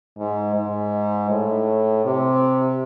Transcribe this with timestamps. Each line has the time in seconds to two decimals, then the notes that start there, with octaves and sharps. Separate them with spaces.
0.19 G#2
0.56 G#2
1.30 A2
2.05 C3